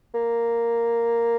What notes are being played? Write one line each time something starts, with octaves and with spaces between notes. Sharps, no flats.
A#3